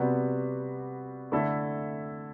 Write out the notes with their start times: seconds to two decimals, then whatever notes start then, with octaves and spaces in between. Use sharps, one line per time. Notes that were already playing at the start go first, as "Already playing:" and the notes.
Already playing: C3 G3 B3 F#4
1.32 D3 A3 E4 A4